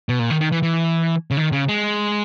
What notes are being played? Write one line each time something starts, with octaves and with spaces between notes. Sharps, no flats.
B2
A#2
D#3
D#3
E3
E3
C#3
D#3
C#3
G#3